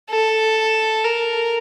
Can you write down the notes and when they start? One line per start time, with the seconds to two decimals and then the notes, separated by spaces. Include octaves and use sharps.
0.10 A4
1.04 A#4